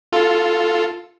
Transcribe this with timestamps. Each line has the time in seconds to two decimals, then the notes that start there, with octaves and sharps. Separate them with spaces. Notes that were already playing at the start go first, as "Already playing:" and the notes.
0.12 F4 A4